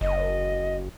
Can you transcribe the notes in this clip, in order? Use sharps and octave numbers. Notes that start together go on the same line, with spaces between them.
F#1 D#5